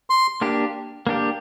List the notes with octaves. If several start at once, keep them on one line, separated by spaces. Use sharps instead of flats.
C6
A#3 D4 G4
A#3 D4 G4